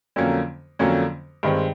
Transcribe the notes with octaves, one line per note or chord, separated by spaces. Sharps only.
F2 D3 F#3 A#3 C#4
F2 D3 F#3 A#3 C#4
G2 D#3 G#3 C4